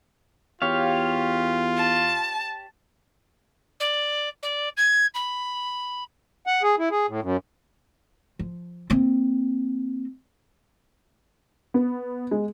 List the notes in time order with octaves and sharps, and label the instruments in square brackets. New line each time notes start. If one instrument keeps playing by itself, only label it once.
[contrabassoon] E2 [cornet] F4 [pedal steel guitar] G4 C#5 F5
[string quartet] A5
[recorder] D5
D5
G#6
B5
[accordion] F#5
G#4
E4
G#4
A2
F#2
[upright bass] F3
A#3 C4
[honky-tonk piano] B3
G#3